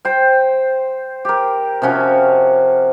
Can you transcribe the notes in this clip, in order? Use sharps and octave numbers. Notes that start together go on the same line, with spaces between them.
C5 G5
G4 A#4
C3 F3 C#4 F#4